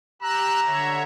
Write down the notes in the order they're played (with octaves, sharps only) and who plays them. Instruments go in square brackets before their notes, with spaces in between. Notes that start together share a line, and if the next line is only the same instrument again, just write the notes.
[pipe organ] G4 E6 F#6 [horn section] A#5
[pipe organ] D3 C#5 E5